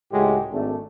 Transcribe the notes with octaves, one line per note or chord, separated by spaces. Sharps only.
C#2 A2 C#3 G#3 F#4 G4
G#1 A3 D4